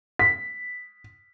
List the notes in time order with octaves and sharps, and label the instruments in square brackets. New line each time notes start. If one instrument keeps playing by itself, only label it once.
[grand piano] B6